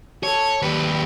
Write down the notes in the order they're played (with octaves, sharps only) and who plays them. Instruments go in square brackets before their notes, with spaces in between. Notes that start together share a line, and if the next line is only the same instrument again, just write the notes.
[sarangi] A4 [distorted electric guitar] C#5
[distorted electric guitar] D#2 B4 [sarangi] G3